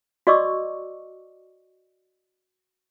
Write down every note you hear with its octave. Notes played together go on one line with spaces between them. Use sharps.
F#4 D5 D#5 C#6 D6 E6